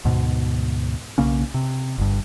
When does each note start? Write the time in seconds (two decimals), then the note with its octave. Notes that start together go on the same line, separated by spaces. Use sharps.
0.05 D2 G#2 B2
1.18 B1 C#3 A#3 C#4
1.54 C3
1.98 G1 G2